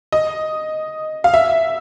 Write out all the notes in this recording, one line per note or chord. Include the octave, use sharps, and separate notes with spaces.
D#5
F5
E5